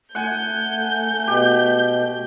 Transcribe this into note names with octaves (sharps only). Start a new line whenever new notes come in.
A3 F#5 G#5 G6
B2 G4